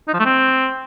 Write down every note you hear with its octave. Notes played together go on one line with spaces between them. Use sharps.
D#4
F3
A3
C4